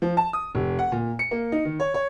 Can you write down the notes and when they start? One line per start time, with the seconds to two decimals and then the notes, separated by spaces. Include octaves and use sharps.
0.02 F3
0.17 A5
0.33 D#6
0.55 F1
0.79 F#5
0.92 A#2
1.19 C#7
1.31 A#3
1.52 D#4
1.65 D#3
1.80 C#5
1.94 C#5